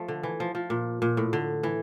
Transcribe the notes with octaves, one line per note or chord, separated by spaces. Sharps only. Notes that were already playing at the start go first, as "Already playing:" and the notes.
Already playing: F3 A3
D3
E3
F3
F3
A#2
A#2
A2
D3
E3